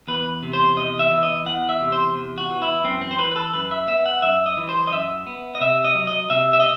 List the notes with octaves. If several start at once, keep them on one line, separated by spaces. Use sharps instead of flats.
E2 B4
C3
C5
E2 D#5
E5
E3
D#5
E2 F#5
E5
C3
C5
E2
F#4
E3
E4
F#2 C4
C4
C5
E3 B4
B4
A4
F#2 B4
E5
B3 E5
F#5
F#2 E5
D#5
E3
C5
D#5
F#2 E5
B3
D#5
C3 E5
D#5
F#3
D#5
C3 E5
E5
D#5